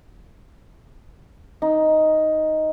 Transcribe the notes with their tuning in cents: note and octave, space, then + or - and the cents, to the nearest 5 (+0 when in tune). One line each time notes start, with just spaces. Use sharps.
D#4 +5